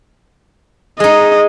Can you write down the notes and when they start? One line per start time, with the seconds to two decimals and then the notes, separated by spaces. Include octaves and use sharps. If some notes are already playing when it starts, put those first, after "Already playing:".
1.00 G#3 D#4 D#5